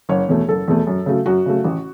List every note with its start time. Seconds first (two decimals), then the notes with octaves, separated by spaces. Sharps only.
0.09 F#1 C#5
0.29 E2 B2 A3
0.48 F#1 A4
0.68 E2 B2 A3
0.87 F#2
1.06 C#3 F#3 A3
1.26 F#2 F#4
1.46 C#3 F#3 A3
1.64 A1